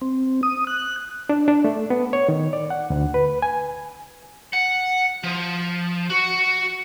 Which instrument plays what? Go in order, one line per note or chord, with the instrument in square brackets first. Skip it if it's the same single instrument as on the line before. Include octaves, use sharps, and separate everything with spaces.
[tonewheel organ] C4
D#6
F#6
[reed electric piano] D4
D4
A3
B3
C#5
D#3
D5
F#5
D2
B4
G#5
[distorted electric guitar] F#5
F3
F#4